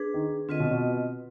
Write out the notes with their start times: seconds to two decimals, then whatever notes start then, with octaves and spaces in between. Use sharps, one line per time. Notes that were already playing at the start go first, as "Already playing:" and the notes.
Already playing: D4 G#4 B4
0.14 D#3
0.49 D3 C4 F4 B4 D#5
0.60 B2
0.71 B2